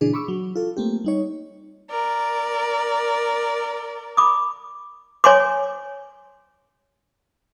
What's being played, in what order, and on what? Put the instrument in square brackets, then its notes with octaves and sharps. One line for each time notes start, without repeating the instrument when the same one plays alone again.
[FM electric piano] A#2 C#3 E3 D4 G#4
B5 C#6 D6 E6
F#3
F4 A4
A3 A#3 C4 G4
G3 D#4 C#5
[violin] A#4 D5
[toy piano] B5 D6 D#6
C#5 G#5 C6 D6